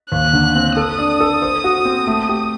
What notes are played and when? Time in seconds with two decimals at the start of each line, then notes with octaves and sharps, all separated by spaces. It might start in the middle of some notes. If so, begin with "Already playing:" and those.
0.12 D#2 F#6
0.33 D3
0.55 C4
0.77 A4 D#6
0.98 D4
1.20 A4
1.42 C5
1.64 F#4
1.85 C4
2.07 A3
2.29 G4